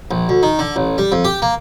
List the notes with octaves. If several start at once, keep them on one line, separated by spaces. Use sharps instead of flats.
A#1
D2
D#3
D3
A1
G3
F2
G4
A#3